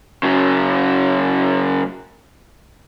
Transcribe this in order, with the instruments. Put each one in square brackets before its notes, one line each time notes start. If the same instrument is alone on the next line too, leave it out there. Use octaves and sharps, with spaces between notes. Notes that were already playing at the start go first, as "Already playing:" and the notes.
[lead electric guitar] C#3 F#3